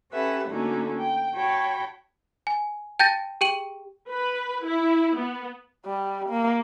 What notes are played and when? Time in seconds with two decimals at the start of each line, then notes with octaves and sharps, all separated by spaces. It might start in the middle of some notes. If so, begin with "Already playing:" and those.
0.12 C#4 G4 A4 B4 E5 F#5
0.47 D3 A3 A#3 C#4 D#4 F#4
0.99 G5
1.35 F#4 C#5 G5 A5 B5
2.47 G#5
2.99 G5 A5 G6 A6 A#6 D#7
3.41 G4 G#4 G5 D#7 F#7
4.10 B4
4.64 E4
5.16 B3
5.86 G3
6.29 A#3